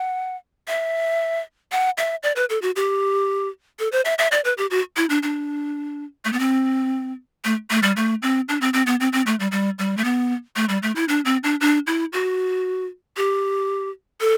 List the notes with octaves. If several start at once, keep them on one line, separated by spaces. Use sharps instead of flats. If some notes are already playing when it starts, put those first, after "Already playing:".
Already playing: F#5
E5
F#5
E5
D5
B4
A4
F#4
G4
A4
C5
E5
E5
D5
B4
G4
F#4
E4
D4
D4
A3
B3
C4
A3
A3
G3
A3
C4
D4
C4
C4
B3
C4
C4
A3
G3
G3
G3
A3
B3
A3
G3
A3
E4
D4
C4
D4
D4
E4
F#4
G4
A4